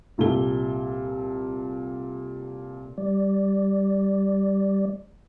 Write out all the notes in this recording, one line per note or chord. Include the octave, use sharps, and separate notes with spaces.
C2 A#2 A4 G7
G3 D5